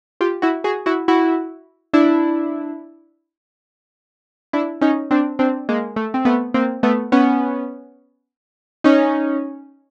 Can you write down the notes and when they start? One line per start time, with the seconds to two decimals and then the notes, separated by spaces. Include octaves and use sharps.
0.21 F4 G4
0.42 E4 F#4
0.64 F#4 G#4
0.86 E4 F#4
1.08 E4 F#4
1.93 D4 E4
4.53 D4 E4
4.81 C#4 D#4
5.11 C4 D4
5.39 C4 D4
5.69 G#3 A#3
5.96 A3
6.14 C4
6.25 A3 B3
6.54 A#3 C4
6.83 A3 B3
7.12 B3 C#4
8.84 C#4 D#4